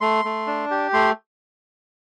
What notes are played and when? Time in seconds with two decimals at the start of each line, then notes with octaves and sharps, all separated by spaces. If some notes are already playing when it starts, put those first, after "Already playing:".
0.01 A3 C6
0.25 A3
0.47 D4
0.71 G4
0.93 A3 C6